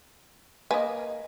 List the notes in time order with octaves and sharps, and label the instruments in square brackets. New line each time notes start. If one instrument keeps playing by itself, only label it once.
[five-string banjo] A#3 D#5 [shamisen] B4 G#5